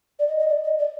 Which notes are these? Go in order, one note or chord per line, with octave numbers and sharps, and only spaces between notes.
D5
D#5
D#5
D5
D#5
D5